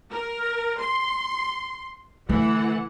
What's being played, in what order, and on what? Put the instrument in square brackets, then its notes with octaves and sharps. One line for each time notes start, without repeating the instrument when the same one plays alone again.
[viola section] A#4
C6
[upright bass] D3 A3 [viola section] E3 F#5